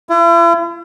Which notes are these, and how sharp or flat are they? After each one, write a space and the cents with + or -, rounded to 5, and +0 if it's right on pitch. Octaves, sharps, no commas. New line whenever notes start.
E4 +45